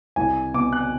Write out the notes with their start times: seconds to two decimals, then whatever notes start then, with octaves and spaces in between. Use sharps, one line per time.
0.16 C2 G#5
0.54 B2 D6
0.73 F#6